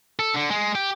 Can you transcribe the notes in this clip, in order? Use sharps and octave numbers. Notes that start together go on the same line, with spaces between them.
A4
D3 D4
G#3
G4